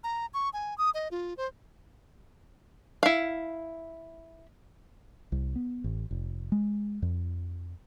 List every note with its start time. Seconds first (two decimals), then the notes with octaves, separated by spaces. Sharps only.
0.04 A#5
0.34 C#6
0.53 G#5
0.78 D#6
0.94 D#5
1.11 F4
1.37 C5
3.03 E4 F5
5.32 C2
5.56 B3
5.84 A1
6.11 F1
6.52 G#3
7.02 F2